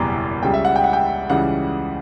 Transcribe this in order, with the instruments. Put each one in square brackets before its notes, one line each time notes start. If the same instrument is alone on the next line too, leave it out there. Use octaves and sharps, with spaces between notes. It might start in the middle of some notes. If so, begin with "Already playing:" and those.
Already playing: [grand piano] F#1 E2 B2 G3 A#5 D6
C#2 C#3 G3 G5
E5
F#5
G5
F#5
G5
C#2 C#3 E3 G3 F#5